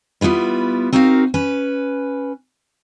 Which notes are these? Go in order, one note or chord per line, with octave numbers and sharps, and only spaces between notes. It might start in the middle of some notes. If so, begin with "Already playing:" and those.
G3 B3 E4 F4 B4
C4 D#4 F#4 A#4 F5
C#4 B4